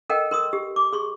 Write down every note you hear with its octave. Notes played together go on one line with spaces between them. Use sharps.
A4 A#4 D#5 F#5 G5
A#4 C6 D#6
G4
D6
G#4 C6 C#6